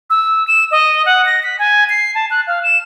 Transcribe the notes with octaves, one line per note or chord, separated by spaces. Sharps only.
E6
E7
D#5
F#5
A#6
B6
G#5
C7
A5
F#6
F5
E7